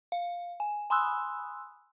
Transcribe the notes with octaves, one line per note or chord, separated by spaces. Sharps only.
F5
G#5
G#5 B5 C6 D#6 E6 F#6